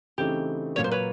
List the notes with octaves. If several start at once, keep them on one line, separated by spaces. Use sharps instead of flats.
C#3 E3 A3 C4 D#4 G4
A#2 F#3 A#3 C#5
C5
B4 C#5